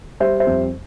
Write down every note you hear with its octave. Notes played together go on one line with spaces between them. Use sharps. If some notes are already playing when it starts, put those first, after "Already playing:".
G3 C5 E5
C5 E5
F2